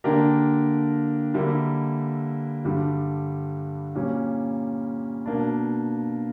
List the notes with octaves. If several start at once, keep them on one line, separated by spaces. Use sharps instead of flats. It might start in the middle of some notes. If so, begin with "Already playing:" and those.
D3 A#3 D4 G4 A#4
D3 G3 A#3 E4
G2 D3 G3
A#2 G3 C#4
B2 A#3 D4